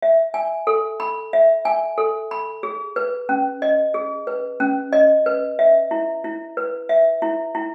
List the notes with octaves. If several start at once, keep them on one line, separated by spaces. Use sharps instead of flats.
E5
G#5
A4
B5
E5
G#5
A4
B5
G#4
B4
C#4
D#5
G#4
B4
C#4
D#5
B4
E5
E4
E4
B4
E5
E4
E4